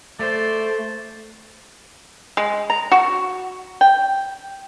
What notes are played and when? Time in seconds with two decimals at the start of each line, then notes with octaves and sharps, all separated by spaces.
0.19 A3 C5 D5
2.37 G#3
2.70 A#5
2.92 F#4
3.81 G5